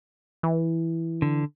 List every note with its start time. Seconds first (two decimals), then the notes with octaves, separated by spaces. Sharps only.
0.43 E3
1.22 D3